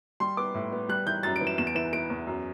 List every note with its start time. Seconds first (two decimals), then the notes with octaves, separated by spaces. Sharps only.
0.20 G3 C6
0.37 B3 D6
0.54 A2
0.72 B3
0.89 G3 F#6
1.06 E3 G6
1.23 F#2 A6
1.36 D7
1.41 E3
1.47 E7
1.58 E2 E7
1.67 D7
1.75 E3 E7
1.93 B3 D7
2.10 E2
2.27 F#2